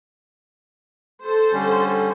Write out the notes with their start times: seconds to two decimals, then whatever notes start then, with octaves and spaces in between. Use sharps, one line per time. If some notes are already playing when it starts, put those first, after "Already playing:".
1.23 A4 C5
1.53 D3 G3 C#4